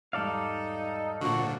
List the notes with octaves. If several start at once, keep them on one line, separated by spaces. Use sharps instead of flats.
E2 G#2 G3 D#4 A4 D5 F5
A#2 D3 F3 F4 F#4